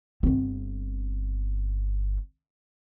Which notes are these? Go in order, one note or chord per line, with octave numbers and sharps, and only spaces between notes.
G1 C4